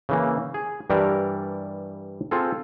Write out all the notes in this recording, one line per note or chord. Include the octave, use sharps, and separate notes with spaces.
C#3 E3 A#3
G#4
G2 E3 G3 A#4 D5 A5
C4 F4 G#4 A4